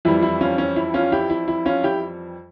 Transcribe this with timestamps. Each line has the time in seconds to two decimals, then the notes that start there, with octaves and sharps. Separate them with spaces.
0.05 F2 E3 G3 E4
0.23 E4
0.41 C#4 F4
0.58 C#4
0.76 E4
0.94 C#4 F4
1.12 E4 G4
1.30 E4
1.48 E4
1.65 C#4 F4
1.83 E4 G4